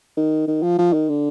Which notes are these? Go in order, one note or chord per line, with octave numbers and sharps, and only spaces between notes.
D#3
D#3
F3
F3
D#3
D3